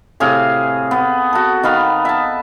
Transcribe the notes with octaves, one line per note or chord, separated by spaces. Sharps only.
A2 C3 G#4 F5
B3
F#4 A4
D#3 B3 F5 B5
E5 A5